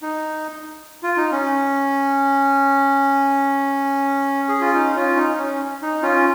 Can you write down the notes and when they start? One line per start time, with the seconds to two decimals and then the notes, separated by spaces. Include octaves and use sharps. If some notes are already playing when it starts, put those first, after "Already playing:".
0.02 D#4
1.03 F4
1.17 D#4
1.32 C#4
4.49 G#4
4.61 F4
4.74 D#4
4.96 C#4 F4
5.17 D#4
5.38 C#4
5.82 D#4
6.03 C#4 F4